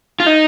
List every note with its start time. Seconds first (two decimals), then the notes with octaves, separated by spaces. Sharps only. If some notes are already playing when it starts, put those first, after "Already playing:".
0.20 F4
0.26 D#4